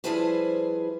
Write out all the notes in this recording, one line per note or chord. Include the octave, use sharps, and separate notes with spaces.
F3 G3 E4 G#4 B4 C5